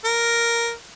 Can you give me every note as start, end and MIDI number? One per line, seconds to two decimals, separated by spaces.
0.05 0.71 70